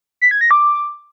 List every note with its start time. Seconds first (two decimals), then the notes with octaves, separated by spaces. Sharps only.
0.21 B6
0.31 G#6
0.41 A#6
0.51 D6